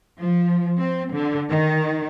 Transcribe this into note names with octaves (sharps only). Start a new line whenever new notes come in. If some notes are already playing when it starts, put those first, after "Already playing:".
F3
C4
D3
D#3